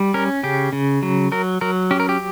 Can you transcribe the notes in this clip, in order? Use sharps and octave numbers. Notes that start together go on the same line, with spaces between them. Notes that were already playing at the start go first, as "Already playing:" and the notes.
Already playing: G3
C#4 A#4
C#3 G4
C#3
F#3
F#3 A#4
F#3 A#4
C#4 G4
A#4
G4